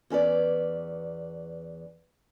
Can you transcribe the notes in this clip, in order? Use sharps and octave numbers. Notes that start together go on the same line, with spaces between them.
E2 C#4 B4 D5